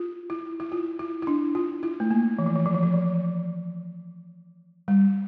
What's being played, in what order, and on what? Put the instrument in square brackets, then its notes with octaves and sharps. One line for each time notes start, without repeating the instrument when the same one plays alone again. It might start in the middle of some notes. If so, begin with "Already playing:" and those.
Already playing: [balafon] F4
E4
E4
F4
E4
E4
D4
F4
E4
A3
A#3
E3
F3
E3
F3
E3
F3
F3
G3